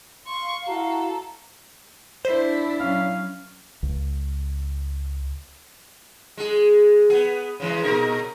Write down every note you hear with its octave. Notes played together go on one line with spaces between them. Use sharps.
F5 C6 C#6
E4 F#4 A4 A#5
D4 E4 C5
F#3 C#4 F5
C#2
G#3 G#4
B3 G#4
C#3 E3 G#3
A#2 D#4 A#4